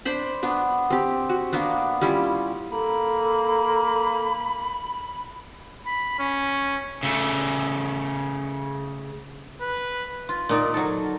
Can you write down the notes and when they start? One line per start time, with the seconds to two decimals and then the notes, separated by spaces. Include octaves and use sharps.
0.05 D4 C5 B5
0.43 B3 D4
0.90 C4 G4
1.29 F#4
1.53 A#3 B3 D4
2.01 G3 C#4 E4 F4
2.71 A#3 A4 B5
5.86 B5
6.19 C#4
7.03 C#3 A3
9.61 B4
10.29 F4
10.49 A#2 D#4 D5
10.74 F#3 A4